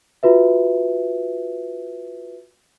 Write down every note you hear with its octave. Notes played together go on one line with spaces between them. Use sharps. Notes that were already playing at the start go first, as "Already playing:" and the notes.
F4 F#4 B4 E5